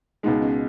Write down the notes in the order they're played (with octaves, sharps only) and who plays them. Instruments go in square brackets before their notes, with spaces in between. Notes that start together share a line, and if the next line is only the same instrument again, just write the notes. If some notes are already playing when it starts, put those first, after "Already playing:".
[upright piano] C#2 B2 G#3 [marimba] D#4
[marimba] C#4